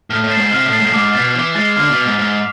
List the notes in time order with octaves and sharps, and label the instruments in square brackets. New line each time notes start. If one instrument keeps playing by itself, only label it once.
[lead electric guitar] A2 [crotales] F6
[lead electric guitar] A2
[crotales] A6 C7 E7
[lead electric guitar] G#2
[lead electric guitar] C3 [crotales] F6
[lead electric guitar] A2
[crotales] A6 C7 E7
[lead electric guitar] G#2
A2
[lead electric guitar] G#2 [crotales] D6
[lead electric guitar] B2 [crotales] A6 C7
[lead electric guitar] E3 [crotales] D6
[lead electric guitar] G#3 [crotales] A6 C7
[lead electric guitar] D3 [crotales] F6
[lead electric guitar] B2
[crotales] B6 F7
[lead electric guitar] G#2
[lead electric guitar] G#2 [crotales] F6